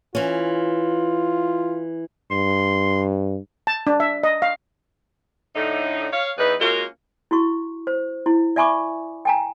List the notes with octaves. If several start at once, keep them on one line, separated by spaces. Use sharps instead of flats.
E3 C#4 F4
G2 C6
A5
D4
E5
D#5
F5
A2 D3 D#4
C#5 F5
E2 D#4 E4 B4
G#3 A#3 C#4 F4 F#4 A#4
E4 F#4 C#6
C5
E4
D5 E5 G#5 B5 C#6 D6
G5 G#5 A#5